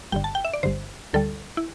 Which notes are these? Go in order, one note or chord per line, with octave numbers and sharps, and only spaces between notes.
G1 G2 D3 G5
A5
G5
E5
D5
G1 G2 D3 C5
D2 D3 G3 A4
E4